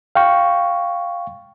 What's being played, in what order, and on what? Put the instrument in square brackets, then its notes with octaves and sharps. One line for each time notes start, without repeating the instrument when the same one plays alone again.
[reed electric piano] F5 G5 C#6